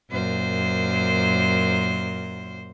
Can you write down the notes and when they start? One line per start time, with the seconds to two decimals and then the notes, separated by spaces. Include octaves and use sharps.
0.11 F#2 A#2 C5